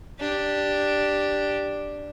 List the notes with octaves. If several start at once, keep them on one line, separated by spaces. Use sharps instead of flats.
D4 G4